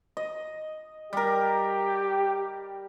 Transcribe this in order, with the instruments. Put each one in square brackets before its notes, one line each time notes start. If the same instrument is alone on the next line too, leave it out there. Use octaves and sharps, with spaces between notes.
[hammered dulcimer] D#5
[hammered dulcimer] G3 A#4 [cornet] G4